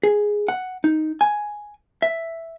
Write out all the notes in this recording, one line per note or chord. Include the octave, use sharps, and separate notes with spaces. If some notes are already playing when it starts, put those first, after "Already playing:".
G#4
F#5
D#4
G#5
E5